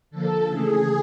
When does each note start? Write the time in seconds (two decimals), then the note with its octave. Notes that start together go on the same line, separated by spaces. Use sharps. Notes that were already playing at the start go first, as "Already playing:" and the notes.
0.10 D3 F3 A#3 A4
0.48 C#3 E3 A3 G#4